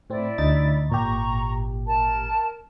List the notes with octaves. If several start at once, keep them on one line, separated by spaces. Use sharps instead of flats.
A2 C4 E4 D5
D2 D#4 A6
G#1 A#2 G4 A#5 C#6
A#4 A5